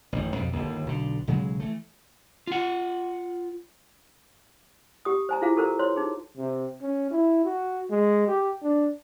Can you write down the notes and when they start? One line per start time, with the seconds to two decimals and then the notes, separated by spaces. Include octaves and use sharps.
0.13 A1 F#2 D#3
0.35 B1 F2 C3
0.53 G1 D#2
0.87 B1 D3
1.28 B1 C#3 F#3 G#3
1.60 E3 A3
2.47 F4 F#5
5.05 G4 D#6
5.29 C5 G#5 A#5
5.42 E4 F4 G#4 C5 F5 A#5
5.56 G4 A4 A#4 C5 A#5
5.79 C5 C#5 C6
5.96 D#4 G#4
6.38 C3
6.82 C#4
7.11 E4
7.44 F#4
7.90 G#3
8.28 G4
8.62 D4